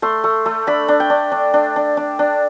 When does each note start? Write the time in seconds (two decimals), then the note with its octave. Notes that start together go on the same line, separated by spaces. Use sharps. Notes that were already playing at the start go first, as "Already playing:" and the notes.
0.02 A3 C6
0.24 A3
0.46 A3
0.67 D4 B5
0.88 D4
1.00 G5
1.10 D4
1.32 D4
1.54 D4
1.76 D4
1.97 D4
2.19 D4